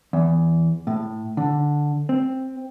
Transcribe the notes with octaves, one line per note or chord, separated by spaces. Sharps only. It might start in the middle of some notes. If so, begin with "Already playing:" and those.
E2
A2
D3
C4